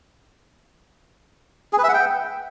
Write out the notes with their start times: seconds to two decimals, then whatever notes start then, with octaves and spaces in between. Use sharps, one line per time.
1.73 G#4
1.78 B4
1.84 E5
1.89 F#5
1.94 G5